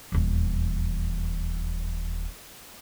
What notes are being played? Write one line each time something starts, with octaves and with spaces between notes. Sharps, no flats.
D#1 E2